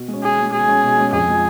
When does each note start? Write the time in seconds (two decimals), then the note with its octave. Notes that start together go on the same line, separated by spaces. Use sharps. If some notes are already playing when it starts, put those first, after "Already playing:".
Already playing: B2
0.08 G#3 C#4
0.23 B2 G#4
0.39 G#3 C#4
0.53 B2 G#4
0.68 G#3 C#4
0.83 B2
0.98 G#3 C#4
1.13 F2 G#4
1.28 F3 G#3